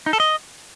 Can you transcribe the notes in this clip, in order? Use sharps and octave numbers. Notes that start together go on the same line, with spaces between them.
D#4
A4
D#5